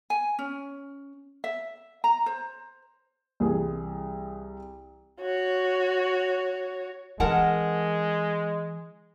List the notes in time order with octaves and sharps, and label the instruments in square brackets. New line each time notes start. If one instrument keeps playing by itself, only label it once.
[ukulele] G#5
C#4
E5
A#5
C5
[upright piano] C2 E3 G#4
[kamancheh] F#4 C#5
[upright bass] E3 C4 [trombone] G#3 [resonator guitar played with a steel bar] A#4 F#5 A5